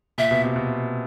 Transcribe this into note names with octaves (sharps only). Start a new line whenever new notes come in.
A#2 E5
B2
C3
B2